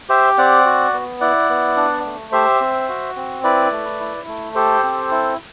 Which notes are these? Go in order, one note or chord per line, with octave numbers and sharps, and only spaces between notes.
G4 C5 E5
C4 D5 F#5
F#4
B3
E4 D5 F#5
B3
D4
A3
G4 C5 E5
C4
F#4
C4
E4 B4 D5
A3
E4
A3
G4 A4 C5
C4
E4